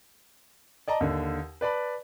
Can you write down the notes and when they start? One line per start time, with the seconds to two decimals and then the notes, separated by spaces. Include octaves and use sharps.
0.88 D5 D#5 A5 A#5
1.00 D#2 D3
1.61 B4 D5 A5 B5